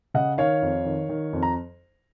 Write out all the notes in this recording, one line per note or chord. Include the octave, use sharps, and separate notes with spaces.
C#3 D#5 F#5
D#3 C#5 F5
F2
D#3
D#3
F2
A#5